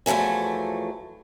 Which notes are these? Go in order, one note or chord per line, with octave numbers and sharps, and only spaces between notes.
E2 F3 F#3 A3 G#5